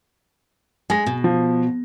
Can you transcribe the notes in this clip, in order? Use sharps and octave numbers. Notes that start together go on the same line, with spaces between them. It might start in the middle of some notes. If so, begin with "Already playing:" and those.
G#3 G#5 A#6
B2
F3